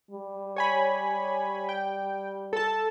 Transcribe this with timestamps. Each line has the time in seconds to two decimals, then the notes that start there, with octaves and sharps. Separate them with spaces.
0.11 G3
0.56 C#5 G#5 B5
1.69 G5
2.53 A4 A5